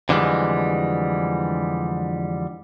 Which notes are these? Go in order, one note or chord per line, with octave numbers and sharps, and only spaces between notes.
F2 D3 E3 F3 G3 G#3